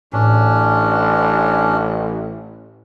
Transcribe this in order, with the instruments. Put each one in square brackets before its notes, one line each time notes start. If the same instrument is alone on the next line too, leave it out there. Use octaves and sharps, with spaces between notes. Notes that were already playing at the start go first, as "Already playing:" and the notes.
[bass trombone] A1 [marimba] A2 [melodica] C#4 D4